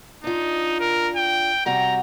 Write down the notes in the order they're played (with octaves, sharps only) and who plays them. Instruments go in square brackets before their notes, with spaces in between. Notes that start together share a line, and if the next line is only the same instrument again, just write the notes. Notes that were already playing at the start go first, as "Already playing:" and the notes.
[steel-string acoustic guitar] D4 F4 [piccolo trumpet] D#4
[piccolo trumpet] A#4
G5
[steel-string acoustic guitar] C3 G3 F#4 [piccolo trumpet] A#5